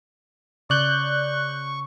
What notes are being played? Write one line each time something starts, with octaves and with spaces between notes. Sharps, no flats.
C#3 D5 C#6 F#6 G6